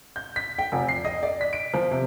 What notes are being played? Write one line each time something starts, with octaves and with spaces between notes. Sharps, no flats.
G6
B6
G5
F1
C7
D#5
D5
B6
D7
F3
C3